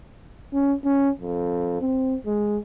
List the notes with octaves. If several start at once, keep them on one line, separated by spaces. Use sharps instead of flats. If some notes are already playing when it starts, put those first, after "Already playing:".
C#4
C#4
F2
C4
G#3